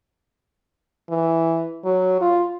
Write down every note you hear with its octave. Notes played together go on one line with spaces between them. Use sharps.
E3
F#3
F4